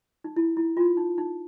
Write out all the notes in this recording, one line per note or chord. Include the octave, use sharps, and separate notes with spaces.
D#4
E4
E4
F4
D#4
D#4